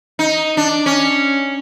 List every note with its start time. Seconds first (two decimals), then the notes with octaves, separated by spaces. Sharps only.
0.19 D#4
0.57 D4
0.86 C#4